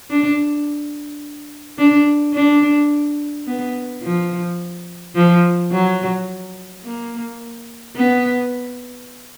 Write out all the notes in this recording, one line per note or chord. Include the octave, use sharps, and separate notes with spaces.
D4
D4
D4
B3
F3
F3
F#3
A#3
B3